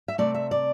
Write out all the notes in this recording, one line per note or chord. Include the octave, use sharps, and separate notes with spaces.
E5
C3 A3 C4 D5
E5
D5